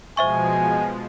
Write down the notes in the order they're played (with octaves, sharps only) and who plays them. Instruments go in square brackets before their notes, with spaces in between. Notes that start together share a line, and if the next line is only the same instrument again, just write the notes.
[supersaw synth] B2 F3 G#3 [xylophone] C5 E5 C#6 [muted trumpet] G#5